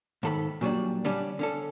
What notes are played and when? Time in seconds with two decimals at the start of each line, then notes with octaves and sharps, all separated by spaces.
0.23 G#2 D#3 A4 A#5 B5
0.61 A#2 F#3 G3 D4
1.04 D3 G3 C#4 D4
1.39 D3 C#4 A4